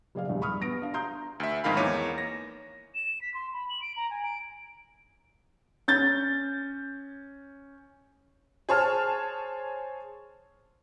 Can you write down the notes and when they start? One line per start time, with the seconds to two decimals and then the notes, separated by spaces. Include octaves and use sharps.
0.15 F#1 G#4 D5 F5
0.29 E2 G2
0.41 B5 C#6 D#6 F6
0.61 B3 A#6 D7
0.82 D4 F5
0.94 A#5 C6 D#6 G6
1.40 D2 E5
1.64 F2 G#2 D#3 A#4 F5 B5
1.77 E2 A#3 D#4 C#5 D6 D#7
2.18 A#6
2.94 E7
3.22 B6
3.34 C6
3.53 B5
3.70 F#7
3.82 D7
3.96 A#5
4.11 G#5
4.23 D7
5.88 C#4 G6 A6
8.69 G#4 C5 C#5 A5 F6